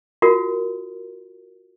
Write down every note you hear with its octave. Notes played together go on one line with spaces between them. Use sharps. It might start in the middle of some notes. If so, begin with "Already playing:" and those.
F4 F#4 A#4